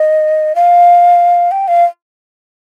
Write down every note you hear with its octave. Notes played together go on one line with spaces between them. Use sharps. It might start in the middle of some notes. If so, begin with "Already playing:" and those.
Already playing: D#5
F5
G5
F5